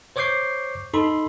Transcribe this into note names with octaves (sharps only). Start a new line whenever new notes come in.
C5 C#5 C#6 D6 G6 C7
D#4 A4 B5 C6